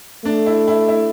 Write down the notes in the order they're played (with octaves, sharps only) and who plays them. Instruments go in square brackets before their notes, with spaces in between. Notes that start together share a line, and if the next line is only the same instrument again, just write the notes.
[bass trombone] A3 [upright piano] D4
[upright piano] E4
E4
E4